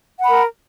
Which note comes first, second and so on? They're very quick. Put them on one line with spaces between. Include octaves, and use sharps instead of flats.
F#5 B5 A#4